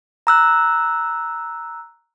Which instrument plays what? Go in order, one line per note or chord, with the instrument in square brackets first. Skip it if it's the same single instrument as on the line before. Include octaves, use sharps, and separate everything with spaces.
[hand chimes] A#5 E6 F#6